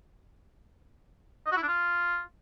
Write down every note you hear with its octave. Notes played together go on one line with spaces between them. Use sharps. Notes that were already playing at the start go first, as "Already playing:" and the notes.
D#5
F#4
E4
D4
F4